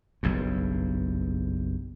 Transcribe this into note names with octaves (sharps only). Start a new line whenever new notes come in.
F#1 B1 G2